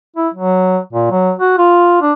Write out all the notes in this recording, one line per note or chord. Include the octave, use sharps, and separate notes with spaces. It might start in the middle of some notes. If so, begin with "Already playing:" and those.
E4
F#3
A#2
F#3
F#4
F4
D4